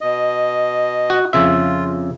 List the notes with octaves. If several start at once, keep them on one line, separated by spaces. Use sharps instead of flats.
B2 D#5
F#4
F2 C#3 F4 E5